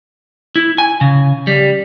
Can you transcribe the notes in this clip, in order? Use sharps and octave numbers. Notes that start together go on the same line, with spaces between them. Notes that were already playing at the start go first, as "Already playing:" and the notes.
E4
G#5
C#3
G3